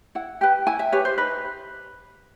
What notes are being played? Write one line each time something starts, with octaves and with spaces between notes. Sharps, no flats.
E4 F#5
G4 B4 G5
E4 G#5
E5
G4 B4 C#5
C5
D#4 B4